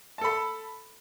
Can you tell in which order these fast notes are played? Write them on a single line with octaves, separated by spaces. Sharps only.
A5 A4 B5